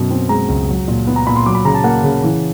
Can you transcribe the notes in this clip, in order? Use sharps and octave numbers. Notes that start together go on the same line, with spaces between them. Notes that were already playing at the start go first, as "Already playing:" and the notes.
Already playing: F#2 B2
C4
G#3 A#5
C#2
F#3
A#2
B3
A#5
A#2 B5
C6
F#3 D6
B5
C#3 A#5
A5
A#3 F#5
C#3
E3